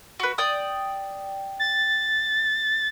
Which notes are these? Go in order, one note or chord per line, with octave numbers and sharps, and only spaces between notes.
F#4 B4
D5 G5 D#6
A6